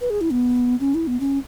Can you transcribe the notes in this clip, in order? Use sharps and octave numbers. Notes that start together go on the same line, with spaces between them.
B4
G#4
E4
B3
C#4
E4
B3
C#4